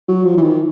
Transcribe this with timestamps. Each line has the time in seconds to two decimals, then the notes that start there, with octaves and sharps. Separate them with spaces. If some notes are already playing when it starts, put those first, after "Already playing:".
0.08 F#3
0.25 F3
0.37 E3
0.42 D#3